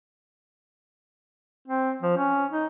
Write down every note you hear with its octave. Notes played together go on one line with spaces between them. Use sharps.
C4
F3
C#4
D#4